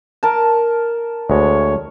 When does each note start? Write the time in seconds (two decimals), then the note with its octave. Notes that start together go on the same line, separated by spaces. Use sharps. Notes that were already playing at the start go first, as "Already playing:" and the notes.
0.23 A#4 A5
1.30 D2 G#3 C#5